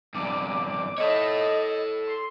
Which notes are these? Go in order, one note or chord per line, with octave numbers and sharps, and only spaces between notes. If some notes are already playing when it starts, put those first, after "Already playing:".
E2 G2 D6
A4 C#5 D#5
C6